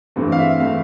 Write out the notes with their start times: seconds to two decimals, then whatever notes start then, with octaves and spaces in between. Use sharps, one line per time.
0.16 G2 E3 A3 C4
0.32 F5
0.38 E5
0.60 E3 A3 C4 F5